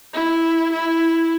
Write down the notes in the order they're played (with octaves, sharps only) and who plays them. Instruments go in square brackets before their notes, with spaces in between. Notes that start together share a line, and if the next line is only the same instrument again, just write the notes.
[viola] E4
E4